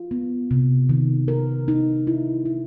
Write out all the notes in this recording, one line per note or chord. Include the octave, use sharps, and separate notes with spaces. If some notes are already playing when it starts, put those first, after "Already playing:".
Already playing: F4
B3
C3
D#3
A#4
D#4
E4
E4